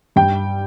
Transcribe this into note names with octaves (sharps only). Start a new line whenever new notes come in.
G2 G5